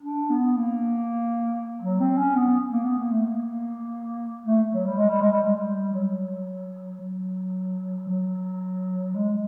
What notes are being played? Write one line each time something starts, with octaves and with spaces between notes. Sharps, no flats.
D4
B3
A#3
F#3
C4
C#4
B3
A#3
B3
A#3
A3
A#3
A3
F#3
G3
G#3
G3
G#3
G3
G#3
G3
F#3
F#3
F#3
G#3